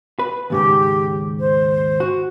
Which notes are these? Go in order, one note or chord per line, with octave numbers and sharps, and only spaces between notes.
B4
D#2 G#2 C#3 G4
C5
F#4